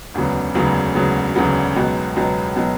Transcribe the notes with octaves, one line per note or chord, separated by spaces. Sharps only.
E1 D2 C#3 F#3 B3
E1 D2 C#3 F#3 B3
E1 D2 C#3 F#3 B3
E1 D2 C#3 F#3 B3
C#2 B2 F#3 B3
C#2 B2 F#3 B3
B2 F#3 B3